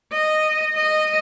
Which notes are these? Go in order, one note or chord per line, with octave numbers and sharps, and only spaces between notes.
D#5
D#5